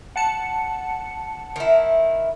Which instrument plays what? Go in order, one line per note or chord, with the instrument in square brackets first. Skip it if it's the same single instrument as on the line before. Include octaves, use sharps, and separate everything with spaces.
[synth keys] F#5 A5 C#7
[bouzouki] D#3 E4